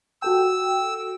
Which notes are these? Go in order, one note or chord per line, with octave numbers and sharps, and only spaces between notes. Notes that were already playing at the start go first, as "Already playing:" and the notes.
F#4 A4 G5 E6